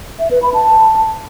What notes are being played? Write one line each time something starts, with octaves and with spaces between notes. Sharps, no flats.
E5
B4
B5
A5